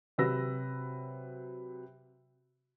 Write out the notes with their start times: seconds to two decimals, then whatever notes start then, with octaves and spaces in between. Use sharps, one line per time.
0.18 C3 F#3 B4 E6 A#6